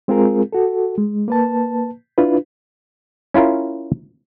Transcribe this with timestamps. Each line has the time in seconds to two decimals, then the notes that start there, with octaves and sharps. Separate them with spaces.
0.08 G#3 C4 F4 G#4 A#4
0.53 F#4 A4
0.97 G#3
1.28 A#3 B4 A5
2.18 D4 E4 F4 B4
3.34 C#4 E4 F4 A#4